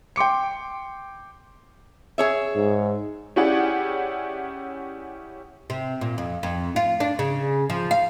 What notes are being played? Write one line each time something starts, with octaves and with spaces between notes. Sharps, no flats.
G5 C6 D6 C#7
G#4 C#5 E5
G#2
C#4 E4 G4 G#4 D5 F#5
C3
A#2
F2
F2
F4
D4
C#3
F3
F5